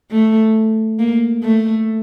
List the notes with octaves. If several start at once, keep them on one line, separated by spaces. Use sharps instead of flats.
A3
A#3
A3